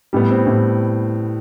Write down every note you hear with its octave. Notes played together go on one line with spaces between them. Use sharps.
A2 G3 B3
C4
A2 G3